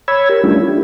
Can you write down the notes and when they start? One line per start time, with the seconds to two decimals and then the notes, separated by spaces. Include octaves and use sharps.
0.08 C#5 B5 E6 G#6
0.29 G4 A#4
0.44 G3 A3 C#4 D4 E4 F4
0.68 D4 E4 G4